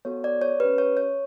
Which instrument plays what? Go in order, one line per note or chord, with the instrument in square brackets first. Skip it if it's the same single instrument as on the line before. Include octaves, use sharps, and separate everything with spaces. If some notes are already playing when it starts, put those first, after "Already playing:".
[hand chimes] B3 F#4 A4 C#5
D5
C#5
C#4 G4 B4
C#5
C#5